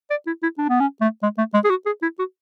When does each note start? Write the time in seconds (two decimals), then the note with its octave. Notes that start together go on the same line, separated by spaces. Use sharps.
0.10 D5
0.27 E4
0.42 E4
0.58 D4
0.69 B3
0.80 C#4
1.01 A3
1.23 G#3
1.38 A3
1.54 G#3
1.64 G#4
1.70 F#4
1.86 G#4
2.02 E4
2.19 F#4